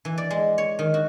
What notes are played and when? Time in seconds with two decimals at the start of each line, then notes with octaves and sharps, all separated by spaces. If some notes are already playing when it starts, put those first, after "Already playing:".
0.05 E3
0.18 D5
0.30 G#3
0.58 C#5
0.79 D#3
0.94 F#4